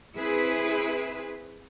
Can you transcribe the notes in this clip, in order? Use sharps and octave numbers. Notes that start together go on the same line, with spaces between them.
C4 E4 G#4 B4